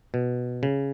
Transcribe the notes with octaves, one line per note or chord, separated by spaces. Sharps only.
B2
C#3